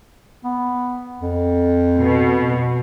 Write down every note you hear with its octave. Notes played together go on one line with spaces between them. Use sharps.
B3
F2
B2